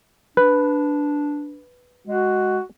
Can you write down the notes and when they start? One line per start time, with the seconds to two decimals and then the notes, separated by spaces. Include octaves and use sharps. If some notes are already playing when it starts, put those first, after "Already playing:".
0.37 D4 B4
2.07 G#3 F#4